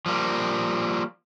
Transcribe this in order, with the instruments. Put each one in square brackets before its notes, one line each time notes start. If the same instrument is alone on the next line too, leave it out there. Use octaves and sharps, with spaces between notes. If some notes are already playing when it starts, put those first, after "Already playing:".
[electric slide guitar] F3 G3 A#3